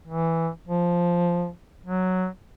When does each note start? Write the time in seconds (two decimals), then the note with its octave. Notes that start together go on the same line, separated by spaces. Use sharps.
0.08 E3
0.68 F3
1.86 F#3